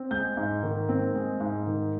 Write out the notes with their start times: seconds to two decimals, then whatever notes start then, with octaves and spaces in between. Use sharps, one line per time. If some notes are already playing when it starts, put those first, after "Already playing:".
Already playing: C4
0.11 G#3 G6
0.37 G#2
0.63 D#3
0.89 C4
1.15 G#3
1.40 G#2
1.67 D#3